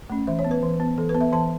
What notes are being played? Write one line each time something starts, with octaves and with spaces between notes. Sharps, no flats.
A3 C#4
E3 E5
C#5
B3
B4
E3
B3
E3 A4
B4
B3
E5
E3 A5